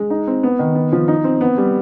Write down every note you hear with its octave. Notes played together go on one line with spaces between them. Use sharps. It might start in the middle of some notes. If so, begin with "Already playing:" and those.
Already playing: G#3
D#4
C4
B3
D#3
B3
F3
D#4
C4
B3
G3